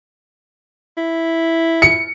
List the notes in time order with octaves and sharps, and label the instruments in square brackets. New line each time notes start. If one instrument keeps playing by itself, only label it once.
[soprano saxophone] E4
[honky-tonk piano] C#7